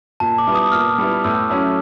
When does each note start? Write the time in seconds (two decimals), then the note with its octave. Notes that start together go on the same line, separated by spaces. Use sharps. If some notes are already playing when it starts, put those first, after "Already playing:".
0.20 A#2 A5
0.38 D6
0.47 G3 B3 E4
0.55 D#6
0.72 A#2 F6
0.98 G3 B3 E4
1.24 A2 E6
1.50 F#3 A3 C#4 E4